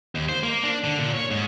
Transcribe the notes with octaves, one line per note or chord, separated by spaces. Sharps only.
D#2
C5
A#3
D4
D3
A#2
C#5
G#2